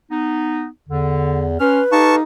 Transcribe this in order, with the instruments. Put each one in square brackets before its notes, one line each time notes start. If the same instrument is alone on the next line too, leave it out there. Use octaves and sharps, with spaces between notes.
[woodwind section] B3 D#4
[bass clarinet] E2 [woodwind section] D3
[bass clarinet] C#4 [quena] B4 [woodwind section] C6 F6
[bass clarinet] D#4 [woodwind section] G4 A4 F5 [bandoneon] A5 C#6